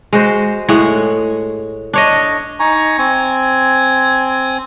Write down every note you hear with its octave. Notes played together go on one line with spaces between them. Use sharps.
G#3 F#4 C5
A2 G#3 C#5 F#5
D4 C#5 D#5
D#4 G#5 A#5 C#6
C4 G#5